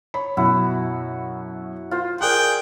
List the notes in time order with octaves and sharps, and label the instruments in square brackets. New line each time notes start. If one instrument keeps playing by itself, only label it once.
[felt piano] C#5 B5
[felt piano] F#2 B2 [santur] E4 F#4
[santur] F4 C5
[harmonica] G#4 G5 [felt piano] A#4 D5 F#6